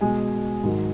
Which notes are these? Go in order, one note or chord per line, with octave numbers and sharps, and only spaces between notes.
B2 G#3 G#5
G#2 D#3 F#3